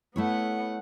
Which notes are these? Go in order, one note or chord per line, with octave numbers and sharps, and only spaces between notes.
A3 B3 E4 C#5 F#5